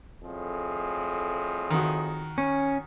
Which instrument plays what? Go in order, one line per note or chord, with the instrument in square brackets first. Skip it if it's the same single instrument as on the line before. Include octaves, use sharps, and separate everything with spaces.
[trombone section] F2 A2 G#4
[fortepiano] D#3 F#4
[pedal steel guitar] C#4